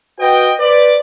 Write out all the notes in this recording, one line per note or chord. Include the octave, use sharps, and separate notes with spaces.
F#4 B4 D#5 G5
B4 C5 D5